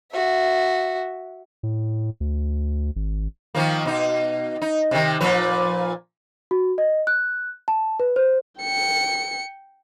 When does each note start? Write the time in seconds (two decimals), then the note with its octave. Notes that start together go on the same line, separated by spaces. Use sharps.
0.12 F#4 E5
1.63 A2
2.20 D2
2.96 G#1
3.55 D#3 F3 A#3
3.85 B2 D#4
4.62 D#4
4.91 C3 D#3
5.20 A#2 F3 B4
6.51 F#4
6.78 D#5
7.07 F#6
7.68 A5
8.00 B4
8.16 C5
8.60 G5 C#7